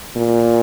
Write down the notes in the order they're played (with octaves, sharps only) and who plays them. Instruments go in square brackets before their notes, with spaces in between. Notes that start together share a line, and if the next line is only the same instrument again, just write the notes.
[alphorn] A#2